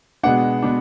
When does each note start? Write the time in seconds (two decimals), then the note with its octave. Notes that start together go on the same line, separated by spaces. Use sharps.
0.23 B2 G#3 B3 D4 F#5
0.62 B2 G#3 B3 D4